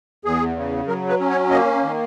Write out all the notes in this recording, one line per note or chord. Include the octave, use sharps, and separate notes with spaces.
E2 G#4
C#3
F#3 A#4
B4
C#4
C#5
A#3 D#5
D#3